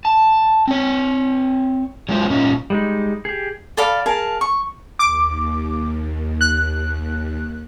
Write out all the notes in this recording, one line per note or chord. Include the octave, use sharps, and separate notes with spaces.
A5
C4 C#5
F#3 G#3 B3 F4 C5 C#5
A#2 C#4 D#4 F4
G3 G#3 D#4
G4 G#4
A4 D5 F5 B5
G#4 A#4 F5 A5
C#6
D#2 D6
F#6